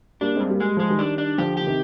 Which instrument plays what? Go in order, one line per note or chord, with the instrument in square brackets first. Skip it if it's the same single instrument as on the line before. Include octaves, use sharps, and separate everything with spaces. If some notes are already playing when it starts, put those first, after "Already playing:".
[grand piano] G3 A#3 [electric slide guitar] D4
[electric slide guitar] G2 [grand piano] G#3 C4
[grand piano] G3 A#3
[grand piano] G3 [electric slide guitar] G#3
[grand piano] F3 [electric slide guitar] G#3
[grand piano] D#3 G3
[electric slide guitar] D4
D4
[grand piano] D3 F3 [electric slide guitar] G4
[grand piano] D3 [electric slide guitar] G4
[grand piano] C3 D#3